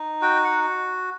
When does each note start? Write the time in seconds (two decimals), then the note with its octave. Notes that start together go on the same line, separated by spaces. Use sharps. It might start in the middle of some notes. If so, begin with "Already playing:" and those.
Already playing: D#4
0.22 F#4 G5
0.44 F#5